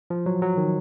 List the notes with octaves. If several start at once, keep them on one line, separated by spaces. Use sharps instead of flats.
F3
F#3
F#3
D#3